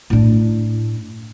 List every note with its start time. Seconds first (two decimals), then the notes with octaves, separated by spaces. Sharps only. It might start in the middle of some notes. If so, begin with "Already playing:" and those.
0.10 A2 D4